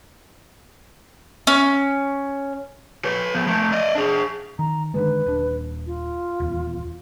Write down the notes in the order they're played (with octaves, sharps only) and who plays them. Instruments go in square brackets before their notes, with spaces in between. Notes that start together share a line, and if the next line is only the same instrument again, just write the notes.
[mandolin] C#4
[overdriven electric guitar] B4 C#5
F3 B3
F3 A3
D5 D#5
D4 G#4
[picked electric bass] D#3 [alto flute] A#5
[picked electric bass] D3 D#3 G#3 [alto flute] B4
[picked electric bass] D#1 D4
[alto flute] F4
[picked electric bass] D#1 E2